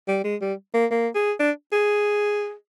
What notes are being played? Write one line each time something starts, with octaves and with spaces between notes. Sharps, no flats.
G3
G#3
G3
A#3
A#3
G#4
D4
G#4